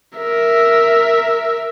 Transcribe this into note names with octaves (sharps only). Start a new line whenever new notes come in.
A#4 E5